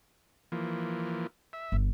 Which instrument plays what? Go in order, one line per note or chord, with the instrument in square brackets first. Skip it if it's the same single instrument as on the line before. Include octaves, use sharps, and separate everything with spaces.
[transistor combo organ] E3 F3 A#3
E5
[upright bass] G1